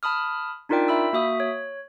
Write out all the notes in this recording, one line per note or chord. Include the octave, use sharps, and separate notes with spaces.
A5 B5 D#6 F6
D4 D#4 F4 A#4 D5 G5
E5 B5 E6
A#3 F#4 E5 D#6
C#5